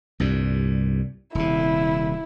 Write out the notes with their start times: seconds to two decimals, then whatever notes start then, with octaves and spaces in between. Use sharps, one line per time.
0.20 C2 G2 A#2
1.35 D#1 C3 E4